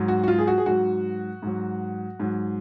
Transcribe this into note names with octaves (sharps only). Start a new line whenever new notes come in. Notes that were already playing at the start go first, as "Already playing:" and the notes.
Already playing: G#2 F#3
F#4
F#4
F4
G#4
F#4
G#4
G#2 F#3 F#4
G#2 F#3
G#2 F#3